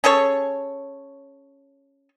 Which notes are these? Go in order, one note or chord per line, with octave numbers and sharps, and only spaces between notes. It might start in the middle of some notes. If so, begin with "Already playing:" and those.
C#4 G#4 A4 C#5